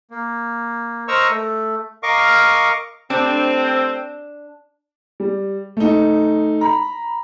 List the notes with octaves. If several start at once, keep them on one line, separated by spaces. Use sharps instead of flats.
A#3
A#4 C5 D#5 A#5 C#6 E6
A3
A#4 D#5 F5 C#6 D6
G3 A3 C4 D4
G3
A3 D#4
A#5 B5